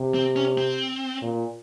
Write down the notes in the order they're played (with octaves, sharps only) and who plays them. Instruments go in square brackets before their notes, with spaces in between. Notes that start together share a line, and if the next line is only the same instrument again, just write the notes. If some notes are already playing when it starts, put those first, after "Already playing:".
Already playing: [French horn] C3
[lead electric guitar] C4
C#4
C4
[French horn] A#2